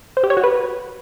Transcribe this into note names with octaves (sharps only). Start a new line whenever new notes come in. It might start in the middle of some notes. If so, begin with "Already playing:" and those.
C5
G4
C#5
F#4
B4